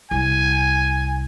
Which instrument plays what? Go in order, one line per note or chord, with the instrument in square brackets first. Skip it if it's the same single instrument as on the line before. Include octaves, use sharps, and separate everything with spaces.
[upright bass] C2 [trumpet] G#5